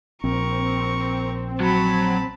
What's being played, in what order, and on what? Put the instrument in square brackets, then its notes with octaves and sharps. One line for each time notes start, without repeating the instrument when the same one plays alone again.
[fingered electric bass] A#1 [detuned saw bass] C4 [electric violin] A#4 C#6
[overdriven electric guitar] F#3 [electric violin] A5 B5